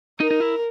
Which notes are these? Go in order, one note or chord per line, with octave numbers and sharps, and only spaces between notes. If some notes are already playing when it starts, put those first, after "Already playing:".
D#4 A#4
D#4
E4